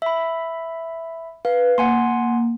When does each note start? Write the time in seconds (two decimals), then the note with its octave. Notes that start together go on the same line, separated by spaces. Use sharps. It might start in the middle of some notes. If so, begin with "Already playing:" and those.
0.02 E5 B5
1.45 B4 F5
1.78 A#3 F#5 G#5 C6